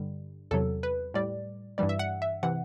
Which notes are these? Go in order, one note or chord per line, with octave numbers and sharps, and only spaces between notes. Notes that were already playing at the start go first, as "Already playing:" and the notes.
Already playing: G2 D3 G3
E2 C3 F#3 A4
B4
A2 G3 D5
G2 E3 G3 D5
E5
F#5
E5
C3 E3 F#5